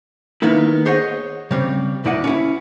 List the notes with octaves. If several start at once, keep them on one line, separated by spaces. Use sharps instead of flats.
D#3 A#3 B3 D#4 E4
G#4 C5 C#5 D#5 F#5
C#3 G3 C4
D2 A#2 E4 D5 D#5 F#5
C#4 E4